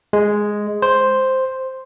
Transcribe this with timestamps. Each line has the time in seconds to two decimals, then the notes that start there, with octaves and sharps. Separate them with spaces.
0.13 G#3
0.82 C5